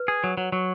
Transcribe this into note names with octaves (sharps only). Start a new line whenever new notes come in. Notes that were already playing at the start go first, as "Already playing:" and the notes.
Already playing: B4
G#4
F#3
F#3
F#3